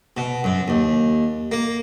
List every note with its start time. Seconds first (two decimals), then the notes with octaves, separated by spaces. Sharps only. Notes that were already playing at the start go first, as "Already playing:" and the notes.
0.17 B2
0.44 F#2
0.68 D#2
1.52 A#3